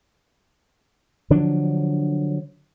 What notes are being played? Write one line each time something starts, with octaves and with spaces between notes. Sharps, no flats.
D3 F3 F#3 D4